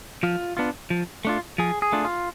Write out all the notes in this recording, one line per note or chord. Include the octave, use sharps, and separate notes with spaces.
F3 F4
B3 D4 F4
F3
A3 D4 F4
F3 G#4
G#4
A3 D4 F4
F4